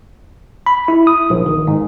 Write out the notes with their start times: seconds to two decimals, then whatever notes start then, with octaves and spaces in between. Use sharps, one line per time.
0.66 B5
0.88 E4
1.07 D#6
1.30 A#1
1.46 D#3
1.67 G#2